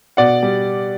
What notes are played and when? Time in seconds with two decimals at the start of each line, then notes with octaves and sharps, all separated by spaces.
0.17 B2 D5 F#5
0.43 G3